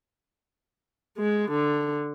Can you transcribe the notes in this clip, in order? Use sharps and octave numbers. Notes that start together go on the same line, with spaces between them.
G#3
D3